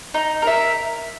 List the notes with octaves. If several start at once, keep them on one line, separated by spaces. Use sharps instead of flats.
D#4
A#4 E5